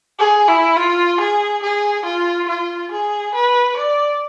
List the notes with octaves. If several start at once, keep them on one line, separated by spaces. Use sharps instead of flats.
G#4
E4
F4
G#4
G#4
F4
F4
G#4
B4
D5